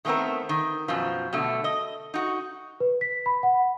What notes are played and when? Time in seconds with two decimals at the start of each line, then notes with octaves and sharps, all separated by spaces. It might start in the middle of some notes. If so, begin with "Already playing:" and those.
0.05 D#3 G#3 A3 B3 C4 A#4
0.49 D#3
0.88 F#2 B2 F3
1.33 B2 D3 A3
1.64 D#5
2.14 D#4 F#4
2.80 B4
3.01 B6
3.26 B5
3.43 F#5